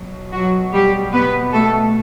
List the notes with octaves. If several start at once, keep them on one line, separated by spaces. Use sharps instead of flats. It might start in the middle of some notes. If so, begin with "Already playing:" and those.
Already playing: B2 F#3
F#3 F#4
G3 G4
B3 B4
A3 A4